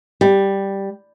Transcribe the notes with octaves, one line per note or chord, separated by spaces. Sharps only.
G3